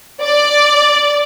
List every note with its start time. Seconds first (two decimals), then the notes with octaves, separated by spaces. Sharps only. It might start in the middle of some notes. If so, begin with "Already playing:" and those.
0.22 D5